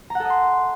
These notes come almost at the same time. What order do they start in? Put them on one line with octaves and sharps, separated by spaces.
A#5 F#5 A4 D#5 C6